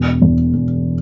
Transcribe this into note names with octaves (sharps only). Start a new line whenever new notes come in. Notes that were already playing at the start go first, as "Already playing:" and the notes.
Already playing: E1
E2
E1